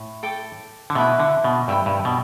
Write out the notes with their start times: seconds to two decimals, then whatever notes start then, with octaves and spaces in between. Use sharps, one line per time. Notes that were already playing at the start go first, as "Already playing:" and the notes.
Already playing: A2
0.23 A4 G5 D6
0.90 D3
0.95 B2 E4 B4 E5
1.20 D3
1.44 B2
1.68 G2 G4 E5 G5 B5
1.86 G2
2.05 B2